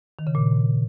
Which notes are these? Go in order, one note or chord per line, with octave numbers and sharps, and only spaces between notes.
D#3
C#3
A#2